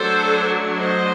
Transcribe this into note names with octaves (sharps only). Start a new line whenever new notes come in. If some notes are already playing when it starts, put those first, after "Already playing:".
Already playing: F#3 A3 D4 A4 C5
C5 D#5